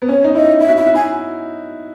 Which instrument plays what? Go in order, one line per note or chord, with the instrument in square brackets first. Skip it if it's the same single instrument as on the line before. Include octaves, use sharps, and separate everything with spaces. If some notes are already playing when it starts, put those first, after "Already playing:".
[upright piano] B3
[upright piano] C#4 [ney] C#5
[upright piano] D#4
[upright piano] E4 [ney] D#5
[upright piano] E4 [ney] E5
[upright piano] F#4
[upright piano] E4 [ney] E5
[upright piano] F#4
[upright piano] E4 [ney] G#5